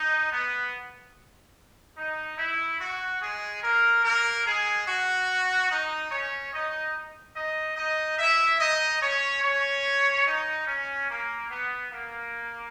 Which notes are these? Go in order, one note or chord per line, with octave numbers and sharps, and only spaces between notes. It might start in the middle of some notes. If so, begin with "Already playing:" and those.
Already playing: D#4
B3
D#4
E4
F#4
G#3 G#4
A#3 A#4
A#3 A#4
G#3 G#4
F#4
D#4
C#4 C#5
D#4 D#5
D#4 D#5
D#4 D#5
E4 E5
D#4 D#5
C#4 C#5
C#4 C#5
D#4
C#4
A#3
B3
A#3